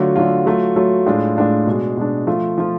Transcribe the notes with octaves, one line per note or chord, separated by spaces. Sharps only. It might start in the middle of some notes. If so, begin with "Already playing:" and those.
Already playing: D3 F#3 A3 F4
D3 F#3 A3 F4
F#3 A3 F4
F#3 A3 F4
A2 G#3 D4 F4
A2 G#3 D4 F4
B2 G#3 D4
B2 G#3 D4
F3 A3 F4
F3 A3 F4